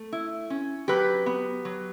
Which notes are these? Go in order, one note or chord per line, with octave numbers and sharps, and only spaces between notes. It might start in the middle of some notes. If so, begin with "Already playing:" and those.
Already playing: A3
E4
C#4
F#3 G4 B4
B3
F#3